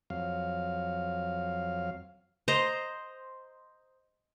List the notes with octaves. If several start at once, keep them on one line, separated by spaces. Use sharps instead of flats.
F2 F#3 F5
C5 D#5 A#5